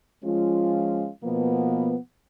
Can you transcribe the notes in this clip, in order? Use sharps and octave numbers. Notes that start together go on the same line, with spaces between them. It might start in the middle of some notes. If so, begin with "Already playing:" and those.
F3 G#3 C#4 F4
B2 F3 A#3 B3